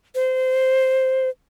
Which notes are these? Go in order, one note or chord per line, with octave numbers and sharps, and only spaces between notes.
C5